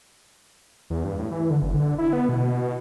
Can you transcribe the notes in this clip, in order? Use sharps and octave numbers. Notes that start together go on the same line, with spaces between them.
E2
G2
A2
E3
D3
F#1
D3
E4
B3
B2
B2
B2